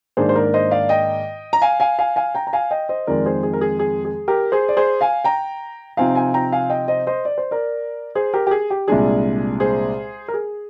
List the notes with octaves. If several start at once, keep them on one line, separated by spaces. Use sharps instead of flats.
G#2 D#3 A#3 D4 G#4 C5
C5
A#4 D5
C5 D#5
D5 F5
D#5 G5
A#5
F5 G#5
F5 G#5
F5 G#5
F5 G#5
G5 A#5
A#5
F5 G#5
D#5 G5
C5 D#5
F2 D#3 G#3 A#4 D5
G#4 C5
G#4
A#4
G#4
G#4
G#4
G4 A#4
G#4 C5
D5
G#4 C5
F5 G#5
G5 A#5
C3 F3 C4 D#4 F5 G#5
F5 G#5
G5 A#5
F5 G#5
D#5 G5
C5 D#5
C5 D#5
D5
C5
A#4 D5
G#4 C5
G4 A#4
G4
G#4
G4
C2 A#2 G#3 D4 G#4
G#4 C5
A#4
G#4